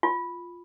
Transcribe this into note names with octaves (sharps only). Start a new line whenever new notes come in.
F4